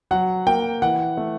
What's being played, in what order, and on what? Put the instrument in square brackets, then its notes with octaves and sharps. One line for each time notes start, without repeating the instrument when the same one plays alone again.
[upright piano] F#3 [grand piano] F#5
[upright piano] A#3 [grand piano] G5
[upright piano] E3 [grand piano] F#5
[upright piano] A3